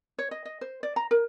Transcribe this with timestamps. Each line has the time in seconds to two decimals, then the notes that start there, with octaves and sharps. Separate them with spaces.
0.18 C#5
0.31 D#5
0.45 D#5
0.61 C5
0.83 D5
0.96 A#5
1.11 A#4